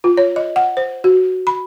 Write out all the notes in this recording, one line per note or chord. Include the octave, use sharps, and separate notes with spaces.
F4
C#5
D#5
F#5
C5
F#4
B5